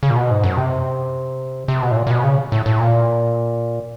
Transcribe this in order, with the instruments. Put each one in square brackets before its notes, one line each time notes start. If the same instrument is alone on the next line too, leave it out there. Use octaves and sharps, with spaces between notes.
[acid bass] C#3
A#2
B2
G#2
F#2
C3
C3
B2
A2
A#2
A#2
B2
C#3
A2
A2
A#2